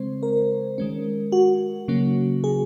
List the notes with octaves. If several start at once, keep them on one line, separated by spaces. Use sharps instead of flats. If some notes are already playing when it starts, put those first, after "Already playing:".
Already playing: C#3 G#3 C4 C5
A#4
D#3 G#3 C#4
F#4
C#3 F#3 A#3 C#4
G#4